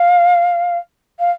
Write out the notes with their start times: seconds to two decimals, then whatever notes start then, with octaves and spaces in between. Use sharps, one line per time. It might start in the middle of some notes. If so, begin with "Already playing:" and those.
Already playing: F5
1.19 F5